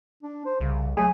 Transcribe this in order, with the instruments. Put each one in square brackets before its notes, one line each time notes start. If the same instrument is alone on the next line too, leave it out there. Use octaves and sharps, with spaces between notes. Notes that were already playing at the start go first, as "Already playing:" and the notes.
[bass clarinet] D4
C5
[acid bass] C2 [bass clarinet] C#3
[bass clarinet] F#3 [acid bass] A3 [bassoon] G#4